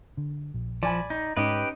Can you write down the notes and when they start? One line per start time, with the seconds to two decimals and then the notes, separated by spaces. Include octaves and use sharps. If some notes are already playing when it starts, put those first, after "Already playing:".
0.17 D3
0.54 A#1
0.83 F3 D5 G#5 B5
1.10 D#4
1.37 G#2 C#4 D#4 G4 B4